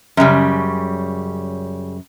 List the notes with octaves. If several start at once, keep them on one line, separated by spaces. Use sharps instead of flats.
F#2 C#3 G3